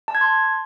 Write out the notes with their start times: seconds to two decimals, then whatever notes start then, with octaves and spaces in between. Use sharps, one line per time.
0.08 A5
0.15 G#6
0.21 C6